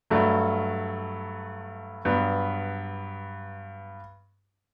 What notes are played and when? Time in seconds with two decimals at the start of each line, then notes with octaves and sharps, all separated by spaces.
0.10 G2 F#3 A3
2.05 G2 F#3 B3